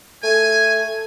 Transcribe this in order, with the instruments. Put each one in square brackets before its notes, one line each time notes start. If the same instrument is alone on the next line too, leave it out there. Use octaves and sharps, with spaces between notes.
[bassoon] A3 [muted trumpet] G#5